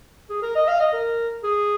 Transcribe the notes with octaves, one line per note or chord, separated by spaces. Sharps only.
G#4
A#4
D#5
F5
D#5
A#4
G#4